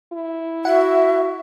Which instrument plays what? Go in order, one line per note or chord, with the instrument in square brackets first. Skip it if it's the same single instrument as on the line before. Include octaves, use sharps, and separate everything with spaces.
[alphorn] E4
[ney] F#4 [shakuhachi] E5 [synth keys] F#5